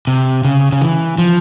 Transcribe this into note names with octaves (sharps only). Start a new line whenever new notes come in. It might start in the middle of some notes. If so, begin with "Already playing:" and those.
C3
C#3
C#3
E3
F3